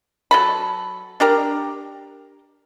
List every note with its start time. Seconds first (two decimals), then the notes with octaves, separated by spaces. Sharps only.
0.31 F#3 A4 B5
1.20 D4 G4 A#4